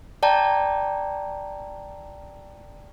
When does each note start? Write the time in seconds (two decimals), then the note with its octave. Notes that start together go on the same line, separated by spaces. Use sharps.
0.23 D5 G5 A5 A#5